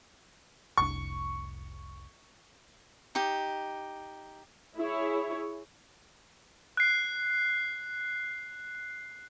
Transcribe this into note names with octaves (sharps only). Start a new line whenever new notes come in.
F1 C2 D4 C#6
D#4 G4
E4 G#4 C#5
F#6 C7